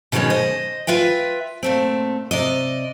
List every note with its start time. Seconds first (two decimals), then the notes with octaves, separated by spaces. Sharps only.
0.12 B2 D3 D#3 F#3 G#3 C#4
0.30 C5 D#5
0.87 F4 B4 E5 G5
1.63 A#2 A3 C4
2.31 C3 D5 D#5